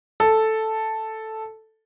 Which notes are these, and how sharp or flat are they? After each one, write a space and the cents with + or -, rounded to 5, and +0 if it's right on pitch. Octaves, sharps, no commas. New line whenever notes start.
A4 +0